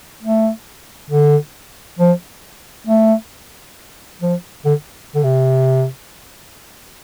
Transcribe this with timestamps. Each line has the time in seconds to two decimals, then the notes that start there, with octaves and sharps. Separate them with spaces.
0.22 A3
1.10 D3
1.99 F3
2.87 A3
4.21 F3
4.65 D3
5.15 D3
5.24 C3